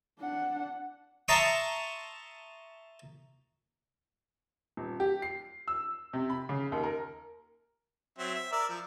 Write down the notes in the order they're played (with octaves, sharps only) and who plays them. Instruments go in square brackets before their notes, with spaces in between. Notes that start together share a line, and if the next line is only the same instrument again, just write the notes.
[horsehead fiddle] D4 F#5
[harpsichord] E5 A5 A#5 C6 C#6 D#6
[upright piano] D#1
G4
C7
E6
C3
B5
C#3
D#2
A#4
[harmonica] F#3 C4 E5
E5
A#4 D5 E6
F3